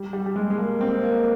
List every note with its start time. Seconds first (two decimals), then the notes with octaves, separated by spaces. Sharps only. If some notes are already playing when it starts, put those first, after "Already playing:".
Already playing: G3
0.13 G3
0.26 G3
0.36 G#3
0.50 G#3
0.58 A#3
0.81 C4
1.03 A#3